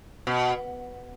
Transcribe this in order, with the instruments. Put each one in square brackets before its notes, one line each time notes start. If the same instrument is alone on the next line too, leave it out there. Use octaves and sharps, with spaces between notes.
[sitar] B2